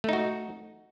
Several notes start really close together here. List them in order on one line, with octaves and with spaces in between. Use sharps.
A3 D#4 F#4